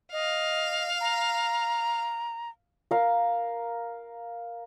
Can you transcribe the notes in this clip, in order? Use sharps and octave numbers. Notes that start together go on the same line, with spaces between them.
D#5 F5
A#5
A#4 F5